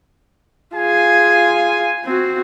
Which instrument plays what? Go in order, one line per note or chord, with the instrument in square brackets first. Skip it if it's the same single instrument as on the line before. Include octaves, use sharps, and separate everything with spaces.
[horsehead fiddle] F4 G#4 [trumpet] G#5
[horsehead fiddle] C4 F#4